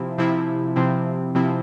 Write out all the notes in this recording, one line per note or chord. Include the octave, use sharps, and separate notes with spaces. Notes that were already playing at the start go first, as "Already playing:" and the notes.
Already playing: C3 F3 C4 E4
C3 F3 C4 E4
C3 F3 C4 E4
C3 F3 C4 E4